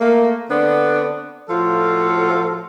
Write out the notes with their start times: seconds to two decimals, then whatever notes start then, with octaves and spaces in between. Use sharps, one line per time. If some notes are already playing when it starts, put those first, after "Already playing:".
0.01 A3 A#3
0.50 D3 B3 C4 D4
1.49 A2 F3 F4 F#4 A4